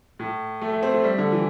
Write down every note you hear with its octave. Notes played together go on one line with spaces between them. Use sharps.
A2
A3
A3
C4
A3
G3
D3
E3